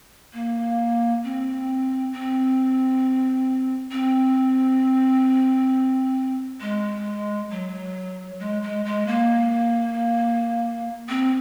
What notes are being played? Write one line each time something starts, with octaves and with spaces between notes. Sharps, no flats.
A#3
C4
C4
C4
G#3
F#3
G#3
G#3
G#3
A#3
C4